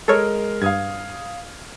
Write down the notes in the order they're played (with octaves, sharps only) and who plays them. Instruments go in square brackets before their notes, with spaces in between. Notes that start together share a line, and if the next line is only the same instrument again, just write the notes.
[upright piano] G#3 A#4 F6 [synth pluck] A4 C#5
[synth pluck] G2 [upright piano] F5 D#6 G#6